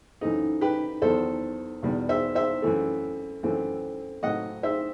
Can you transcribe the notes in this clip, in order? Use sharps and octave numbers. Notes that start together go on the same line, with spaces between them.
F#2 E3 A3 C4 D#4
G4 B4
E2 D#3 F#3 B3 A4 C5
E2 B2 G3
C5 E5
C5 E5
F#2 E3 A3
F#2 E3 A3 C4
A2 F#3 A3 C4 D#5 F#5
C5 E5